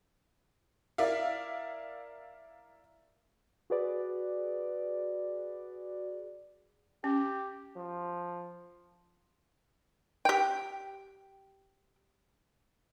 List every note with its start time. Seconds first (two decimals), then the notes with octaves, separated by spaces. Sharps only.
0.98 E4 A#4 D5 E5 F5
3.70 F#4 G#4 B4 D5
7.04 C#4 G4
7.76 F3
10.25 G4 G5